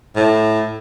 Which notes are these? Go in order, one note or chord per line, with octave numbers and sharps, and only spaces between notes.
A2